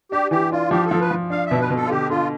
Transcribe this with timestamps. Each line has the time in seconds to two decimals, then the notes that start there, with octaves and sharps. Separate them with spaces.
0.12 D4 G4
0.31 E3 G4
0.52 D4 F4
0.71 F3 G4
0.86 A4
0.91 F3
1.01 B4
1.11 F3
1.30 D4 F5
1.46 B2 E5
1.60 B4
1.70 B2
1.76 A4
1.85 F4
1.90 D3 G4
2.10 D3 F4